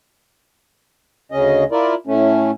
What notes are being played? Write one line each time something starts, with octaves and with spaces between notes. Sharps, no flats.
D2 C#3 C#4 D#5
E4 F4 A#4 D5
A2 A3 C#4